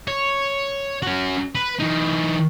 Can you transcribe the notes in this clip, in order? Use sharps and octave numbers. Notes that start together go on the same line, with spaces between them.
C#5
C#4 F#4
B4
E3 D#4